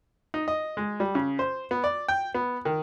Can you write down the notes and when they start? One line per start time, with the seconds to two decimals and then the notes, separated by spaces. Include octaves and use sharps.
0.34 D#4
0.48 D#5
0.77 G#3
1.00 G3
1.15 C#3
1.39 C5
1.71 B3
1.84 D5
2.08 G5
2.34 B3
2.65 D#3